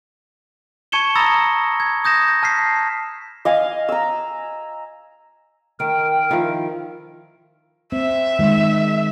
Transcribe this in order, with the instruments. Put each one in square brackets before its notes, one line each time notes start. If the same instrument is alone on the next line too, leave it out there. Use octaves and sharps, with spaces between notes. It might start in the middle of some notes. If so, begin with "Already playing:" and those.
[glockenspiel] A5 C#6 G#6 C#7 E7 G7
A#5 B5 D#6 E6 A6 A#6
G#6
D#6 G6 A#6 E7
G6
A5 F6 B6 C7
[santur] D#5 F5 G#5
A#5 E6
[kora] D#3 [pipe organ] A#4 G5
[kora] D#3 F3 E4
[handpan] C4 [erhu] E5
[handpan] D#3 G#3